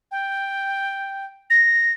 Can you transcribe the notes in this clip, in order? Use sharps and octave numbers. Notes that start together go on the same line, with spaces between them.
G5
A#6